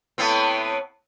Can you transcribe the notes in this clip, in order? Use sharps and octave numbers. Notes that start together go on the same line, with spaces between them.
A2 B3 C4